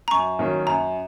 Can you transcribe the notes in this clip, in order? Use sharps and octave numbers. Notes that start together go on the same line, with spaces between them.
A#5
F#2 C#6
D#3 F#3 A#3 C#4
F#2 A#5